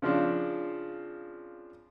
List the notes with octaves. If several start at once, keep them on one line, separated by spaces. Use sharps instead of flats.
C#3 F3 C4 D4